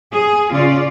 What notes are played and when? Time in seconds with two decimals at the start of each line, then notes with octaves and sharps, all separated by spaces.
0.12 G#4
0.50 C#3 F4 D5